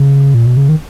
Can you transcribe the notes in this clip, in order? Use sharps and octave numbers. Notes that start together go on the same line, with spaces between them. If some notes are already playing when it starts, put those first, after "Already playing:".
Already playing: C#3
A#2
B2
C#3
D#3